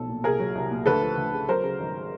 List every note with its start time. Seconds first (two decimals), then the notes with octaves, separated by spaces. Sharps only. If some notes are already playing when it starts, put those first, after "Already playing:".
Already playing: B1 F3 A3 A4
0.09 A#2
0.24 C2 G#4 A#4
0.39 F#3
0.55 C2
0.71 A#2
0.86 D2 A4 B4
1.02 F3
1.17 D2
1.32 C#3
1.49 F#3 A#4 C5
1.63 C#3
1.80 G#1